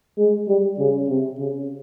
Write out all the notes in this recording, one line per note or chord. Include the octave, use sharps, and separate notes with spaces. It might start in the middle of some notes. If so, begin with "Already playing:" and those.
G#3
G3
C#3
C3
C#3